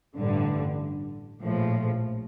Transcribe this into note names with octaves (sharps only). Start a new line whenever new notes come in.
A1 G2 D3
A#1 A2 F3